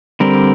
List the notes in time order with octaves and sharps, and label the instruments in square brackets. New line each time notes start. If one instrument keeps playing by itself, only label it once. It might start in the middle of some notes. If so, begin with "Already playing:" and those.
[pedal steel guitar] D3 G3 C4 A#4